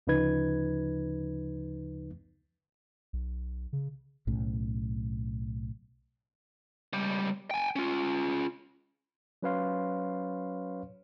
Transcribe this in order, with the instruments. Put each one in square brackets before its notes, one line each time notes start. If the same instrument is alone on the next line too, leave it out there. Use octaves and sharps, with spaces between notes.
[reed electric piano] D2 C#3 F3 D#4 B4 G#6
[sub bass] B1
C#3
[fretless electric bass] B1 A2 C#3
[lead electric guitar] C#2 G3
G5 G#5
C#4 F4
[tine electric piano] F#3 C#4 B4 C#5 F5 C6